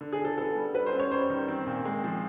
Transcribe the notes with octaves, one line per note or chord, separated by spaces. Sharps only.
D3
G#4
D3
A4
B3 A4
G3
B3 B4
C5
F#2
C#5
G3 C5
D#3
C4
A#2
G#3
F3